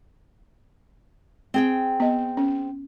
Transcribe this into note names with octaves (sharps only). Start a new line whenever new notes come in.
C4 G#4 G5
B3 D#5
C#4